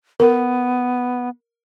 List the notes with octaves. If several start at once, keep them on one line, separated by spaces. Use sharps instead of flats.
B3 A#4